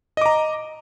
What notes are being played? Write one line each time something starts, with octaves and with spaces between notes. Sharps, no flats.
D#5 A#5 D6